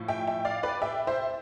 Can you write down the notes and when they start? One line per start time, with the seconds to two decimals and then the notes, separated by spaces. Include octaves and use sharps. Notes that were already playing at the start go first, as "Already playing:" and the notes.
Already playing: A2 F3
0.08 E5 G5
0.27 E5 G5
0.45 D5 F5
0.63 B4 D5
0.82 E5 G5
1.07 C5 E5